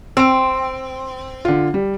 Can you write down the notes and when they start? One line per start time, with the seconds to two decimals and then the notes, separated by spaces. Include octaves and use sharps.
0.17 C4 E6 D7
1.45 D3 F4
1.74 G3